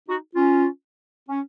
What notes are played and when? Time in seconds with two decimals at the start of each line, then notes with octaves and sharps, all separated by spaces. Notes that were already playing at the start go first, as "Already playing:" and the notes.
0.09 D#4 F#4
0.35 C#4 F4
1.29 C#4